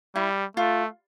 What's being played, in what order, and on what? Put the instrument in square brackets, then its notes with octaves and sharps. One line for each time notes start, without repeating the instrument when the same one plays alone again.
[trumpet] G3 [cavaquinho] E4
[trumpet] A3 [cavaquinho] F4